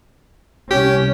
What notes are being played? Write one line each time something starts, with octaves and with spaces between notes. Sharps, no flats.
C2 C#4 G4